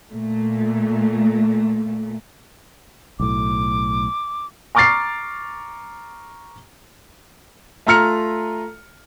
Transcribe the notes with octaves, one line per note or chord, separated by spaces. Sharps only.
A#2 A3
B1 A2 D6
A#5 C#6 D6 F6 A6 C7
A3 F4 A#5 F6 C#7